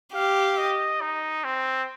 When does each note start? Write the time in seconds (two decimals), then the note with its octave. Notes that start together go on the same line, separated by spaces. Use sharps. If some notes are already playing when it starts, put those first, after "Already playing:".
0.14 G4 F5
0.57 D#5
1.01 D#4
1.44 C4